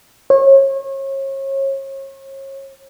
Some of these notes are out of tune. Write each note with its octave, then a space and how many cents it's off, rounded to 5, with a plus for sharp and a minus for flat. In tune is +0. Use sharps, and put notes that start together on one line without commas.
C#5 -35